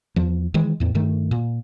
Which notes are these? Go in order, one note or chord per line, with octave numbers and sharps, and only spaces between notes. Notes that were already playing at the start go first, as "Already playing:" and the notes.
E2 F3
D#3 E3 G#3
E2 A2
G2 D#3 A3
A#2